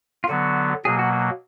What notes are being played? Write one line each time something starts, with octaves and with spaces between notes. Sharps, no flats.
F4
D3 F#3 B3 F#4
B2 F#3 A#3 G#4
F#4
F#4